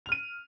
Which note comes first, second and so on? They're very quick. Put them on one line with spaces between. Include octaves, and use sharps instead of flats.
F7 F6 D#7